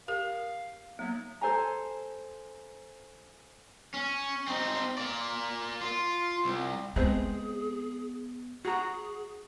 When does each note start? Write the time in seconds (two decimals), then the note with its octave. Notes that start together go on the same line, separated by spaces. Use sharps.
0.08 G4 A#4 F5
0.99 F#3 A#3 B3 D#4
1.41 A4 C5 G#5 A#5
3.94 C#4
4.48 C4 D#4
4.98 A#3 D5
5.81 F4
6.45 C2
6.96 G#3 B3 C4 G#4 C5
8.65 F#4 G#4 A#5